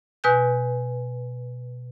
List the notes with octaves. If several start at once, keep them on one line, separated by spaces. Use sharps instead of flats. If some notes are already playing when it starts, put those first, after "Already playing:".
B2 B4 G#5 F#6 G6